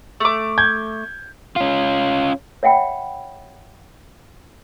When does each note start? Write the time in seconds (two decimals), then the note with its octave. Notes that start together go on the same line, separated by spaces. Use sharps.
0.20 A3 D6
0.58 G6 G#6
1.56 C#4 F4
2.63 C#5 E5 F#5 G5 B5